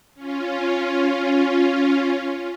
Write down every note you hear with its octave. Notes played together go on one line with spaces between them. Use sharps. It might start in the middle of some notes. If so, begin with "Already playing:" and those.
C#4 F4